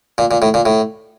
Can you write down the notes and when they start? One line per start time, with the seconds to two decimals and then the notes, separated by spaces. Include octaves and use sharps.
0.18 A#2
0.31 A#2
0.42 A2
0.54 A#2
0.66 A2